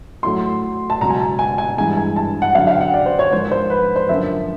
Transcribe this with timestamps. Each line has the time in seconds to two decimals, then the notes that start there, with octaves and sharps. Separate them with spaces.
0.23 A2 F#3 A3 C6
0.90 A5
1.01 C#2 B2 F#3 A#5
1.10 G#5
1.20 A5
1.39 G#5
1.58 G#5
1.78 G2 E3 G#3 G#5
1.97 G#5
2.16 A5
2.42 F#5
2.55 F#2 D3 F#3 F5
2.67 F5
2.75 G5
2.81 F#5
2.94 D5
3.06 C5
3.19 C#5
3.31 G#2 F3 A#3 C5
3.51 C5
3.70 B4
3.96 C5
4.09 F#2 D3 F3 A#3 E5